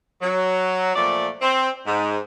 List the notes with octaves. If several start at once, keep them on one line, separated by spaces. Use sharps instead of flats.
F#3
A#2 F3 A3 D5
C4
G#2